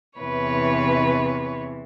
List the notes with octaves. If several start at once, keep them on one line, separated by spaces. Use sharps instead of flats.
E2 C3 E3 B4 C#5